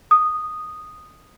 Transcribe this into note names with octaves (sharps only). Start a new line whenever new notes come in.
D#6